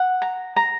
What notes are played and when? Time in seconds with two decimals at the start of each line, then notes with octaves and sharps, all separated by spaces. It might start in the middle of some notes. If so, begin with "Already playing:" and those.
Already playing: F#5
0.22 A#5
0.56 A#5